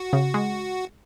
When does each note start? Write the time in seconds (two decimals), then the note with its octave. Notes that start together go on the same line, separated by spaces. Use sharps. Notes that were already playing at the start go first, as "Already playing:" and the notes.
Already playing: F#4
0.13 C#3
0.34 G#3